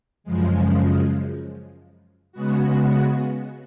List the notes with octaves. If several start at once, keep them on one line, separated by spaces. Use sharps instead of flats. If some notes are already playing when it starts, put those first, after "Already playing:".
F#2 C#3 F3 G#3
C#3 G#3 B3 F#4